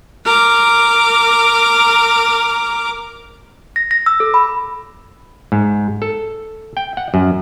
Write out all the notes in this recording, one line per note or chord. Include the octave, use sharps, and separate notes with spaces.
A#4 D6
A#6
A#6
E6
A4
B5
G#2
A4
G5
F#5
F#2